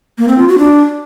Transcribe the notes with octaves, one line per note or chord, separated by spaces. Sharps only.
A#3
C4
F4
F#4
D4